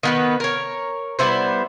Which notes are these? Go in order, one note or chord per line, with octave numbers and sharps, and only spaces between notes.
D#3 B3 B4
A#4 C#5
G3 B3 E4 C5